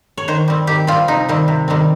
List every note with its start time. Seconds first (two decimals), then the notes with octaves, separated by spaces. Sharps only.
0.17 C#5
0.28 D#3 C5
0.48 G3 C4
0.67 D#3 G4
0.87 G3 C4 F4
1.08 C3 D#4
1.29 D#3 G3 C4
1.48 C3
1.68 D#3 G3 C4